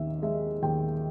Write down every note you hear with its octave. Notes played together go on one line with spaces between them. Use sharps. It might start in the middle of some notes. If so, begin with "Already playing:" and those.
Already playing: D#2 D#3 E5
G#3 E5
D#2 G5